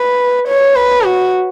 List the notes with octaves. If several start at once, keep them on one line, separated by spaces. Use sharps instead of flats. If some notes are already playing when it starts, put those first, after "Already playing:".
Already playing: B4
C#5
B4
F#4